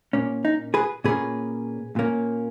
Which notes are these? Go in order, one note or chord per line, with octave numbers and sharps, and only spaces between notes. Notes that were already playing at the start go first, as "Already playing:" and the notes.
A#2 A#3 C#4
D#4
G#4 B4
A#2 A#3 C#4 G#4 B4
A#2 A#3 C#4